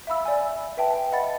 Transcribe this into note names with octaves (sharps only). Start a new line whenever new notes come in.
E5 F5 B5 E6
D5 G#5
B4 E5 G5 A5
D#5 F#5 B5 A6